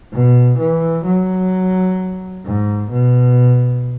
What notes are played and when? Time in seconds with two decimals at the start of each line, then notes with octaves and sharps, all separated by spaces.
0.13 B2
0.59 E3
1.05 F#3
2.45 G#2
2.92 B2